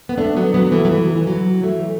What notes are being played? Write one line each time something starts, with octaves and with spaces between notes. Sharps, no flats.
B3
A3 D4
F#3 B3
F#3 B3
F#3
E3 A3
F#3
E3
E3
F#3
E3 A3